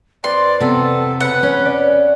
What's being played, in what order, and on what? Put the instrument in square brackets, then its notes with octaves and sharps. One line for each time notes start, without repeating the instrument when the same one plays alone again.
[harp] F2 B4 [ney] D5 [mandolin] C6
[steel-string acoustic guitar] C3 B3 [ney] A4
[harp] C#3 [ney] B4 [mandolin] F#5
[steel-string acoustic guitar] C#4
[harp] D5